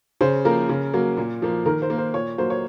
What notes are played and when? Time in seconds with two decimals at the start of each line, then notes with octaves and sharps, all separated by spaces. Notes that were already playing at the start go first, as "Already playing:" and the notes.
0.21 C#3 C5
0.45 F3 A#3 A#4
0.69 C#3
0.94 F#3 A#3
1.17 A#2
1.42 F3 A#3
1.66 D#3 A#4
1.82 C5
1.90 A#3
1.98 C5
2.14 A#2 C#5
2.38 F#3 A#3 C5
2.50 C#5